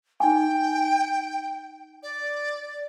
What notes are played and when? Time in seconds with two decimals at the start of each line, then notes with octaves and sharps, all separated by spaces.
0.20 D#4 G5 G#5
2.03 D5